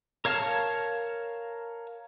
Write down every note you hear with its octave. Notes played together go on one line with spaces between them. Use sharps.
A#4 C#5 F5 A5 F6